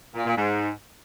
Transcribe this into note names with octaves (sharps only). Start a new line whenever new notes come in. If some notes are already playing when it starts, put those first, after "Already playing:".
A#2
A#2
G#2